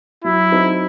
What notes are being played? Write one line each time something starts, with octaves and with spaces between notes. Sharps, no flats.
F#3 E4
C4 D#4 F#4 A4